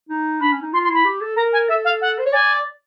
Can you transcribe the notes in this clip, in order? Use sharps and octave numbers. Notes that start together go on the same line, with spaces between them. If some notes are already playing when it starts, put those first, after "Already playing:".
D#4
D4 B5
C#4
D#4
F4 C6
C6
E4
B5
G4
A4
A#4 A#5
G#5
A4 E5
F5
F#5
C5
C#5
D5 G#5